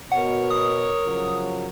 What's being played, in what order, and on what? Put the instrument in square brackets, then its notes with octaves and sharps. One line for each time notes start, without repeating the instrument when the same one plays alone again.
[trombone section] B2 [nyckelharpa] A#4 C#5 [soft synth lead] F#5
[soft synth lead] D#6
[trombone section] C#3 F3 F#3